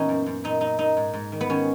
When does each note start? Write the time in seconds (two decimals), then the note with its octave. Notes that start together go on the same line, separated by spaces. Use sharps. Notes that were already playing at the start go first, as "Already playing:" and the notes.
Already playing: A#2 E3 B3 C#4 D#4
0.09 F#2
0.26 F#2
0.44 A#2 D#4
0.61 A#2 D#4
0.79 A#2 D#4
0.97 G#2
1.14 G#2
1.32 D#3
1.41 B3
1.50 D#3 C#4